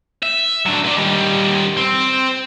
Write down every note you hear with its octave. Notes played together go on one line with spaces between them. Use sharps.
E5
F#3 D4
B4 D5
D#3 G3
C4